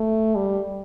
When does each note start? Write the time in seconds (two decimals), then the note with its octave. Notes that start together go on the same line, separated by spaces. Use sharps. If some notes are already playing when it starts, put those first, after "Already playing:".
Already playing: A3
0.35 G3